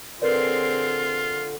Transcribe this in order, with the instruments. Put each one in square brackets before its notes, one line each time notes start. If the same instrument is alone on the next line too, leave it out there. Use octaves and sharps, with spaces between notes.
[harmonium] D3 [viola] C4 G#4 [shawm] F4 [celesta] A#4 B4 D5